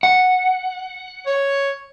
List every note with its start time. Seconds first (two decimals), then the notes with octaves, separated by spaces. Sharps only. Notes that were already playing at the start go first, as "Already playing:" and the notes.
0.03 F#5
1.26 C#5